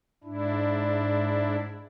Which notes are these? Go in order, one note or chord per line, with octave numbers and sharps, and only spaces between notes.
G#2 D4 E4